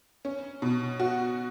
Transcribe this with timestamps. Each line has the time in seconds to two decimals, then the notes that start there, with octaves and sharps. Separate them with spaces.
0.25 C#4
0.62 B2
1.00 F#4